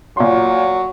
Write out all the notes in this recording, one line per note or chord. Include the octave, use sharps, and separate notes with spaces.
A#2 F#3 C6